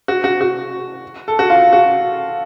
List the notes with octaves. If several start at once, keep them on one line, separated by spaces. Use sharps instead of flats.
F#4
F#4
F#4
A4
F#4
F4
F#4